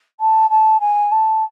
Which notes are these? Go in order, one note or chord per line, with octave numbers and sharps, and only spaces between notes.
A5
A5
G#5
A5